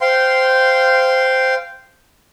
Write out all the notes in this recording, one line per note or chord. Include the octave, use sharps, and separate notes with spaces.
C5 F5 G5 C6